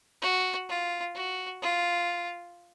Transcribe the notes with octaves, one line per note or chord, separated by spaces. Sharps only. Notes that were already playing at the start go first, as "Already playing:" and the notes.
F#4
F4
F#4
F4